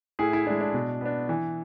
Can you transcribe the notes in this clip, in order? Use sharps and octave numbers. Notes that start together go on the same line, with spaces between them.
A2 E4 G#4
E4
G#3 D4 E4
D4
B2
B3 D4
E3